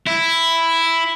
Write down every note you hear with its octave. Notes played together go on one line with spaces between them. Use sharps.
E4